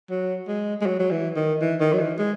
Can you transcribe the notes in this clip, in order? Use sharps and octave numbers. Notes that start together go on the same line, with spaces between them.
F#3
G#3
G#3
F#3
F#3
E3
D#3
E3
D#3
F#3
E3
G#3